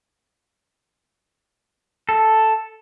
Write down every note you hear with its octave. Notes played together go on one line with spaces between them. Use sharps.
A4